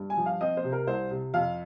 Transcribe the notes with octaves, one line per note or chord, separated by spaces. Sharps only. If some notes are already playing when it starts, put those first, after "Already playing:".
Already playing: G2
G#5
F3
F5
C4 D#5
C5
C3
A#4
C2 C5
C3
F2 F5